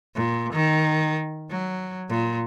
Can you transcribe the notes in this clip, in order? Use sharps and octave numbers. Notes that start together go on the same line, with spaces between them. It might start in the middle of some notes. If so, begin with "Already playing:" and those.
A#2
D#3
F#3
A#2